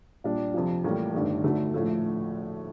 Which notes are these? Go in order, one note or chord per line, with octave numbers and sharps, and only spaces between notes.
A#2 G3 D4
F2 C3 F3
A1 A2 G3 A#3 F4
G1 G2 D#3 A3
D2 D3 A3 D#4
A#1 A2 F3 A3